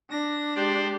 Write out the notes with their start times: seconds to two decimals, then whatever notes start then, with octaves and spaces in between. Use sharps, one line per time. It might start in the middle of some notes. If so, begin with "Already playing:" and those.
0.11 D4 A#6
0.56 G#3 G4 C5 D5